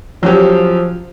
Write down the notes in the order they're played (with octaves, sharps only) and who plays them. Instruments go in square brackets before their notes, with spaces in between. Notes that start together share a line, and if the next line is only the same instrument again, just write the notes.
[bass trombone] F3 [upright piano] F#3 C#4 G4